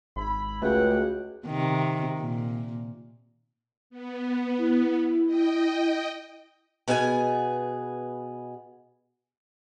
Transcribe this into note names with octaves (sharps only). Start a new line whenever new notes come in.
G#1 E4 B5
C#2 A3 F#4 G#4 F#5 G5
C3 D#3
A#2
B3
E4
D#5 G5
B2 B3 G#4 E5 G#5